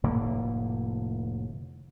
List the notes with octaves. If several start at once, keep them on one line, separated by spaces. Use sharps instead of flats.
F1 A2 D3 A#3